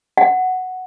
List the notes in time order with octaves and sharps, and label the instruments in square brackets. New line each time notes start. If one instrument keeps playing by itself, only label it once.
[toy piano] F#5